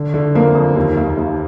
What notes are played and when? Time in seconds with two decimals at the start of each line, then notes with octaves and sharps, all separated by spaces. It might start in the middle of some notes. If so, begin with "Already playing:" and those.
Already playing: D3
0.14 D3
0.35 F2 A#3
0.55 F2
0.76 D#2
0.97 D#2
1.17 D#2